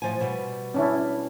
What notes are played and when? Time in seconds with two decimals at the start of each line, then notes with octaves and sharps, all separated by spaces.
0.02 A2 F3 G#5
0.21 B2 G3
0.74 C#4 D4 E4